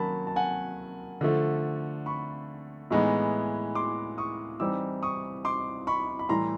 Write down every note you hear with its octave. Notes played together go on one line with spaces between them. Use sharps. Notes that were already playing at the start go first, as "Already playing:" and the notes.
Already playing: D#3 F#3 A#3 C#4 A5 B5
A5
F#5 G#5
D3 F3 A3
B5 C#6
A2 E3 G#3 B3 D#4
C6 D6
C#6 D#6
E3 G3 C4 D#4 D6 E6
C#6 D#6
C6 D6
B5 C#6
B5
A2 E3 G3 A#5 C6